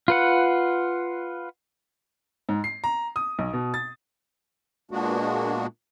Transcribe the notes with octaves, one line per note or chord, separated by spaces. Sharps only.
F4 B4 F#5
G#2
C7
A#5
D#6
B1
B2
A6
A#2 G#3 A#3 B3 D4 F#4